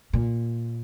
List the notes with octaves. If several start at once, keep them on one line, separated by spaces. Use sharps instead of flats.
A#2